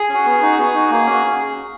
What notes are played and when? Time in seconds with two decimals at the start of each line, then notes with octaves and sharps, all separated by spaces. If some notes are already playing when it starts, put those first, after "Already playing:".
Already playing: G#4
0.09 C#4 F#4
0.26 B3
0.41 D#4 F#4
0.58 B3 G#4
0.74 D#4 F#4
0.91 A#3
1.07 C#4 F#4